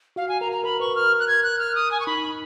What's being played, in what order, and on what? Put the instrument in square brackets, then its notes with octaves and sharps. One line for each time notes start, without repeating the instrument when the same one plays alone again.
[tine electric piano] F#4 [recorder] F5
[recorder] G#5
[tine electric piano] A#4 [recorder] A#5
[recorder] A#5
[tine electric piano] A#4 [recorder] B5
[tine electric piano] B4 [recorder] C#6
[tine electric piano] A#4 [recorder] F6
[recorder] F#6
G#6
F#6
F6
D#6
G#5
C#6
[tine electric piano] D#4 [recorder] B5